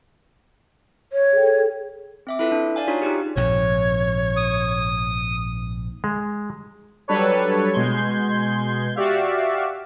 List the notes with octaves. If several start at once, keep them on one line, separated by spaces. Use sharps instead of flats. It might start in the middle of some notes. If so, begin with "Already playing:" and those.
C#5
G#4 A4 G5
C4 E5 D6
E4 F4 A4 B4 E5
D4
D5 F5 G#5
D4 D#4 F4 F#4 C#5
D#4 F4 G4 G#4
A#1 G#2 C3 C#5
D#6
G#3
F#3 G3 D4 A4 B4 C#5
B2 G#3 C6 G6 G#6
F#4 G4 D5 E5 F5